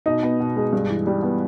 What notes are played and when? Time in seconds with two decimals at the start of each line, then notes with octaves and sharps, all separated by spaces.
0.06 B2 D#4
0.23 B3
0.40 B2
0.56 G#3
0.73 G2
0.89 E3
1.07 G3
1.23 B3